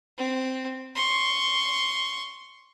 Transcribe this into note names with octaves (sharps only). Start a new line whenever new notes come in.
C4
C6 C#6